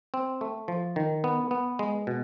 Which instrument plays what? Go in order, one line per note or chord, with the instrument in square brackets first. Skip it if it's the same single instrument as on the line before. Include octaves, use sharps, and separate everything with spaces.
[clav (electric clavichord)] C4
A3
F3
D#3
B3
B3
G#3
B2